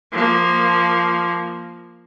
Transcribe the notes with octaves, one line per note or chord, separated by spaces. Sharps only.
F3 A#3